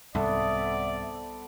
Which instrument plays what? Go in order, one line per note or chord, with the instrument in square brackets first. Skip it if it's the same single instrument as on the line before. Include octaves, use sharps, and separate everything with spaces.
[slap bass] C2 G#2 [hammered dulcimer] B3 A4 C5 [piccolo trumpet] D5 [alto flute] E5